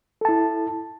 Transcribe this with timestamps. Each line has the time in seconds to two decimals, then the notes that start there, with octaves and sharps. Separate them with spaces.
0.21 A4
0.25 A5
0.29 E4